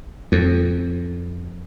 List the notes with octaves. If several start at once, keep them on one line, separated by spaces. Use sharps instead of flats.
F2